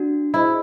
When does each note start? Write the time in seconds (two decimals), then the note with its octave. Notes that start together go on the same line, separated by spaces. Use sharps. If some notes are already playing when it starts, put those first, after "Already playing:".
Already playing: D4 F#4
0.34 E4 G#4 C5 D#5